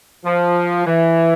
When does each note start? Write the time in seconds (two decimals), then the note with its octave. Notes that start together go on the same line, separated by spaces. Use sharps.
0.25 F3
0.87 E3